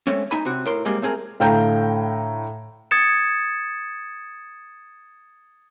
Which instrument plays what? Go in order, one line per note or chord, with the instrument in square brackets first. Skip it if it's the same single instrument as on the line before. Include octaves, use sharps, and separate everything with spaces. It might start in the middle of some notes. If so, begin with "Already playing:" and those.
[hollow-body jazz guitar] G#3 A3 C4 C#4
D#4 E5 G#5 B5
C3 C4 F#4
A2 A#4 C6
G3 G#3 A#3 C4 G4 G#4
A3 C4 G#4 A#4
[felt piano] A2 D3 F5 G5 A#5 G6
[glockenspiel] D#6 G#6 A6 C#7 E7